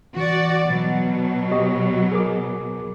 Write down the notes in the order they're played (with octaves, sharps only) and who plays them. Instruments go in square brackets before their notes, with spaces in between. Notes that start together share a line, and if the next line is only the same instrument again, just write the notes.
[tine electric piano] E3 [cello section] F#4 D5
[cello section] B2 F#3
[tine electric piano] G4 D#5 C#6
G#4 A#4 D6